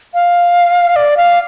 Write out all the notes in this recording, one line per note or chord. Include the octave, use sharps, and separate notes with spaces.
F5
D5
F5